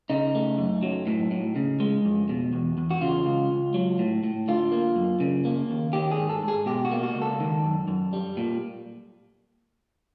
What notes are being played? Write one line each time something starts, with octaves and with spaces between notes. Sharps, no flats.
C#3 D#4
A3
F#2
F#3
A2
A2
C#3
G#3
F2
B2
E2
E2
F#4
C#3 F4
C#2
C#2
F#3
A2
A2
D3 F4
A#3
F#2
C#3
A#3
D#2
D#3 G4
G#4
G#2
A4
G#2
G#4
B2 G4
F#4
A#3
F#4
C#2
A4
D#3
F#2
F#2
G3
A#2